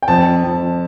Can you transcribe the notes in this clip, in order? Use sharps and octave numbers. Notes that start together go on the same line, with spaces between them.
G5
F2 A5
F2